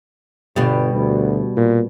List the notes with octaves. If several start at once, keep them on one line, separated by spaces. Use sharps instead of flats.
G1 B2 G3
D2
A#2